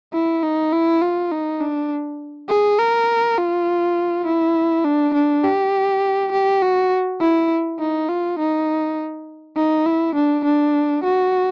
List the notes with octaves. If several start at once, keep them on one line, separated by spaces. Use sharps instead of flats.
E4
D#4
E4
F4
D#4
D4
G#4
A#4
F4
E4
D4
D4
G4
G4
F#4
E4
D#4
F4
D#4
D#4
E4
D4
D4
F#4